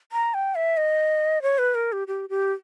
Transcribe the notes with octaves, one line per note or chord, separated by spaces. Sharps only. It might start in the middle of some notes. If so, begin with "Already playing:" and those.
A#5
G5
E5
D#5
C#5
B4
A#4
G4
G4
G4